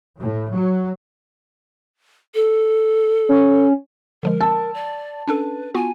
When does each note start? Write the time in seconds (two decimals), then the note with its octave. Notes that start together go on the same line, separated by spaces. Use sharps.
0.18 A2
0.53 F#3
2.35 A4
3.29 C#4
4.23 D3 F3 G#3 A#4
4.41 A5 E6
4.74 D5
5.28 C#4 D4 A4 B4
5.74 B3 F4 F#4 G#5